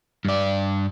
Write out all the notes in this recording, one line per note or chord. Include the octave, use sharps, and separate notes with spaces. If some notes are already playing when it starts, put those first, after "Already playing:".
G2 D5